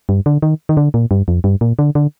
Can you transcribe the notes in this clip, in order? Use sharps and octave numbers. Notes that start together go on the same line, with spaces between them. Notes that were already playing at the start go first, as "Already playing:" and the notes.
G2
D3
D#3
D#3
D3
A#2
G2
F2
G2
A#2
D3
D3